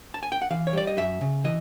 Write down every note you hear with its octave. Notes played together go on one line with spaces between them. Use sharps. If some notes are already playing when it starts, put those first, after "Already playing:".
A5
G#5
G5
F#5
E3 F5
C#5
G3 D5
D#5
F#2 E5
C#3
E3 D#5